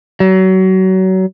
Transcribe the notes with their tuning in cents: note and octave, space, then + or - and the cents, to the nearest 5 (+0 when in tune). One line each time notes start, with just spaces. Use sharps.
F#3 +30